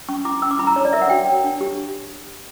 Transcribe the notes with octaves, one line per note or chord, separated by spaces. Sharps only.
C#4 C#6
E4 D6
C#4 E6
D6
E4 B5
A#5
D4 C#5
D5
A#4 E5
F#5
F#4 G5
C#5
D4
G4